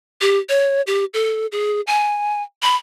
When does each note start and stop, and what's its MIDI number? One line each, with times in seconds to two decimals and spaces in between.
0.21 0.39 67
0.49 0.82 73
0.87 1.05 67
1.14 1.46 69
1.52 1.81 68
1.87 2.42 80
2.63 2.76 83